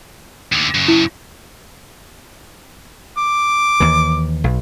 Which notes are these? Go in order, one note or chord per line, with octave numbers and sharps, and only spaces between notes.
D#2 D3
F#2 C#3
E4
D6
D#2 E3
B1